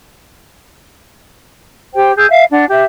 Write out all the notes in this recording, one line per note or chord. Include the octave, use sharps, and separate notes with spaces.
G4 C5 G5
G#4 G#5 E6 G6
E5 F5
D4 F#5
G4 E5